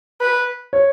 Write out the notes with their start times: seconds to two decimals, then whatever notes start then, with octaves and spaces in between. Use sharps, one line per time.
0.21 B4
0.73 C#5